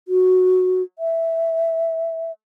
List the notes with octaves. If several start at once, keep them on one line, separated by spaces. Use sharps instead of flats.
F#4
E5